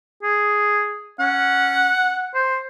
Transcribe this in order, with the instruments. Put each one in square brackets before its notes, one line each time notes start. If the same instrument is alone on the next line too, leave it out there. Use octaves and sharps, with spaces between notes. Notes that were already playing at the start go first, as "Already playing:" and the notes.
[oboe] G#4
[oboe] C#4 [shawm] F#5
[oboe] C5